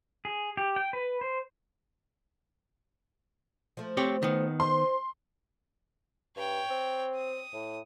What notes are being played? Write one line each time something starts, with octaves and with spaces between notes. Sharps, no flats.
G#4
G4
G5
B4
C5
F3 A3
C4 G4 C#5
D#3 B3
D#4 C5 C6
G2 C#5 G5
C4
D#6
A2